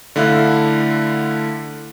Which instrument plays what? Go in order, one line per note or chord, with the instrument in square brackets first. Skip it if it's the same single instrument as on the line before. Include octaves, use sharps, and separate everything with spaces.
[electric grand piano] D3 A3 E4 F5 F#6